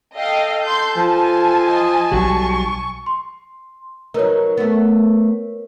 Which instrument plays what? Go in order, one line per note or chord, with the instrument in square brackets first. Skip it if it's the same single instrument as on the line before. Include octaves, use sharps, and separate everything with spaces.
[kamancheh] A4 [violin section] D#5 F5 G5
[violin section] C6 G6
[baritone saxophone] F3 [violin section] G#5 A5
[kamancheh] D#5
[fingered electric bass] B1 F#3 G3 [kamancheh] C#6
[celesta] C6
[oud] F#3 D#4 [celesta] A#4 B4 C#5
[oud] A3 B3